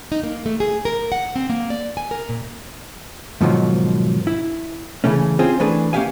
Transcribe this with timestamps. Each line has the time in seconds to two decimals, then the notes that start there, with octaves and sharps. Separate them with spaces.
0.12 D#4
0.23 A#3
0.46 A3
0.60 G#4
0.85 A#4
1.12 F#5
1.36 C4
1.50 A#3
1.70 D5
1.97 G#5
2.11 A#4
2.29 A#2
3.41 G#2 B2 D#3 F3 F#3
4.27 E4
5.04 C#3 E3 A3 C#4
5.39 C4 C#4 F4 G#4
5.60 E3 A3 D4 G#4 B4
5.93 A#3 C#4 G4 E5 F5 G#5